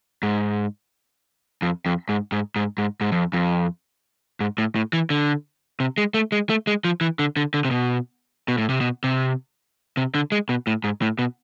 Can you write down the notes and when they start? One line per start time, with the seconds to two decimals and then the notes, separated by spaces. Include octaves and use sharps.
0.23 G#2
1.62 F2
1.86 F2
2.09 G#2
2.32 G#2
2.56 G#2
2.78 G#2
3.01 G#2
3.12 F2
3.33 F2
4.40 G#2
4.58 A2
4.76 A2
4.93 E3
5.10 D3
5.80 C3
5.98 G#3
6.14 A3
6.32 G#3
6.49 A3
6.67 G#3
6.85 F3
7.01 E3
7.19 D3
7.37 D3
7.54 D3
7.65 C3
7.71 B2
8.48 B2
8.58 A2
8.69 C3
8.81 B2
9.04 C3
9.97 C3
10.15 D3
10.32 G#3
10.49 B2
10.67 A2
10.84 G#2
11.02 A2
11.19 B2